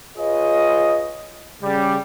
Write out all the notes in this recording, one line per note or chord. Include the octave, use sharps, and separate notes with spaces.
F4 G#4 B4 C#5 D#5
C#3 G3